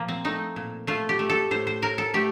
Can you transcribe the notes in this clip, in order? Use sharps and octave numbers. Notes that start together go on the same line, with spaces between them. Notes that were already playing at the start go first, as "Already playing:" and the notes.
Already playing: A#2 F3 A#3
C4
A3 D#4
A#2
A3 F4
G4
A3
A4
A2 C5
C5
A2 A#4
A4
A3 G4